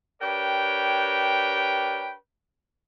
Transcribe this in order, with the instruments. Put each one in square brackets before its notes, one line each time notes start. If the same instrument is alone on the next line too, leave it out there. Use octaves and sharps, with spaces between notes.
[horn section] D4 G4 A#4 B4 C#5 G5